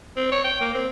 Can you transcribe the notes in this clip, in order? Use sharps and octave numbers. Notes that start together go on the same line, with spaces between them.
C4
C#5
G5
A#3
C4